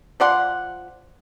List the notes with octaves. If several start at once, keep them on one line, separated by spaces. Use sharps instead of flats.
F3 D5 F#5 C6